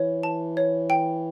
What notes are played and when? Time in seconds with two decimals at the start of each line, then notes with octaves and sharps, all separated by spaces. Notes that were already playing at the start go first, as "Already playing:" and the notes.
Already playing: E3 C#5
0.23 A5
0.57 C#5
0.90 G5